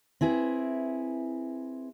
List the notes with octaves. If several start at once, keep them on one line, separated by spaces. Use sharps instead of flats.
C4 E4 G#4 B4